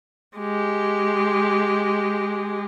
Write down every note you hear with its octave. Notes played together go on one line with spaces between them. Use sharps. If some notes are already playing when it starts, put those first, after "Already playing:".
G#3 G4